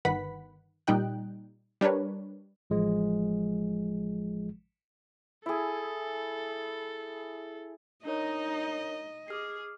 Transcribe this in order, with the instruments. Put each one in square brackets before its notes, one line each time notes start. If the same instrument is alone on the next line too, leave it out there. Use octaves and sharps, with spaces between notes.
[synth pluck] G1 D#3 B4 F#5 B5 B6
A#2 G3 D#4 D#5 G5 F#6
G3 D4 A#4 B4 C#5
[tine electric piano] A1 F3 G#3
[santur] E4 G#4 [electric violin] A4
[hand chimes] D4 A#4 C#5 [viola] D#4 [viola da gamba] D#5
[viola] G#4 [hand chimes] D6 F6 C7